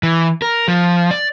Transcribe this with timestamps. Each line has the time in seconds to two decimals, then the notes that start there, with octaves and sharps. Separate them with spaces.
0.03 E3
0.42 A#4
0.68 F3
1.11 D5